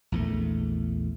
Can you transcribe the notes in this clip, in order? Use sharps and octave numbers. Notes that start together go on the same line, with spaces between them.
A#1 E2 A3